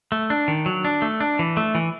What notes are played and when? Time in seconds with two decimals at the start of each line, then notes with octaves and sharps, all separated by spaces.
0.12 A3
0.30 D4
0.48 D#3
0.66 F#3
0.85 D4
1.02 A3
1.20 D4
1.39 E3
1.57 A3
1.75 E3